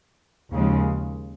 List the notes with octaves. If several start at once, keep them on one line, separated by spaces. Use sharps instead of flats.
D#2 C#3 F3 G#3